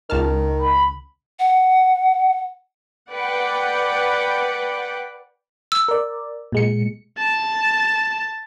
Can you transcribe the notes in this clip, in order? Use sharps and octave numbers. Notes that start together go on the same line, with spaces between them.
C#2 D#3 A5 F6
B5
F#5
B4 D5 F#5 G5
E6
A#4 D5
A#2 G#3 C#7
A5